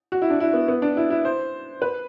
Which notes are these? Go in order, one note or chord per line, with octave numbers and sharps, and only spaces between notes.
F#4
E4
D4
E4
B3
B3
D4
E4
E4
C5
B4